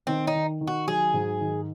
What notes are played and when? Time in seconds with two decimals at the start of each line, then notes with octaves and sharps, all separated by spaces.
0.07 D#3 C4
0.27 D#4
0.34 D#3
0.61 D#3
0.67 F#4
0.87 F#3 G#4
1.14 G#2
1.41 D#3